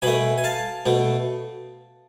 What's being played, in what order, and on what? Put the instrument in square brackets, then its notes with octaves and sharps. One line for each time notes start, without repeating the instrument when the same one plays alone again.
[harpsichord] B2 A3 G#5 B5
G#5
F5 A5
B2 A3